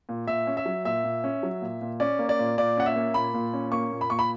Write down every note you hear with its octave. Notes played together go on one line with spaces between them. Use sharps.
A#2
A#2 E5
C#4
E5
F#3
A#2 E5
A#2
C#4
F#3
A#2
A#2
C#4 D5
A#3
D5
A#2
A#2 D5
C#4 F#5
E5
A#3
A#2 B5
A#2
C#4
A#3 C#6
A#2
B5
A#2 C#6
B5